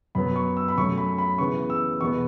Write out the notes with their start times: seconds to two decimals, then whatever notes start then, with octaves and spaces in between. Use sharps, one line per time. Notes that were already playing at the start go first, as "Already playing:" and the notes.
0.15 F#2 F#3 B3 B5
0.36 C#6
0.57 E6
0.68 B5
0.78 F#2 F#3 A3 C#4 C#6
0.98 B5
1.18 B5
1.38 C#3 E3 B3 C#6
1.70 E6
2.01 E2 B2 B3 C#6